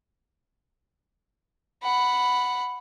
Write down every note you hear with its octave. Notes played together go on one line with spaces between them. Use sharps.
F#5 B5